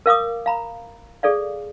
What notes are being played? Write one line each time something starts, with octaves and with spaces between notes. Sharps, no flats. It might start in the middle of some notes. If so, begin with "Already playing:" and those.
A#4 F5 D6 D#6
F5 A#5 B5
G#4 A4 D5 F5